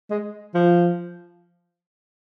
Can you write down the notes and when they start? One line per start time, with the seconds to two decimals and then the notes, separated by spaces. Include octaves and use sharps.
0.10 G#3
0.55 F3